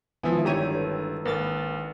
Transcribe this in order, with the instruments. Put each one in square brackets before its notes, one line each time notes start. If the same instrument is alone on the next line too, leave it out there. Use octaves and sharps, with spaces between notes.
[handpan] D#3 G#3 E4 [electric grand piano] F3 B3 [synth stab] E5 G#5
[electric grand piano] G1 A#5 D#7 [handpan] D4 E5 [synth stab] G4 C#5
[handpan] A4 B4
[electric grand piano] G#1 [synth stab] A#3 A6 [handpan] B4